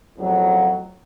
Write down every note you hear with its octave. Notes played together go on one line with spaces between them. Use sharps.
F2 A2 C#3 F#3